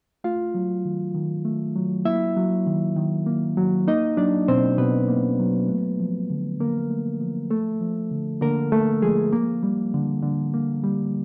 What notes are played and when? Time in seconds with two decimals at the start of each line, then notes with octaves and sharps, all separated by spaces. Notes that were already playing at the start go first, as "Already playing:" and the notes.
0.24 A3 F4 F5
0.55 F#3
0.85 D#3
1.15 D#3
1.45 A3
1.76 F#3
2.05 A#3 E4 E5
2.37 F#3
2.67 D#3
2.96 D#3
3.26 A#3
3.57 F#3
3.88 A#3 D#4 D#5
4.17 F#3 D4 D5
4.48 B2 C4 C5
4.78 B2 B3 B4
5.08 A#3
5.40 F#3
5.69 A3
6.00 F3
6.30 D3
6.60 D3 A#3 A#4
6.91 A3
7.21 F3
7.50 A3 A4
7.81 F3
8.12 D3
8.41 D3 A#3 A#4
8.72 A3 A4
9.02 F3 G#3 G#4
9.32 A#3
9.63 G3
9.94 D3
10.23 D3
10.54 A#3
10.84 G3